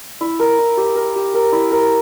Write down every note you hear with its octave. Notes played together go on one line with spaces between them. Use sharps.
E4
A#4
E4
G4
A#4
G4
A#4
E4
A#4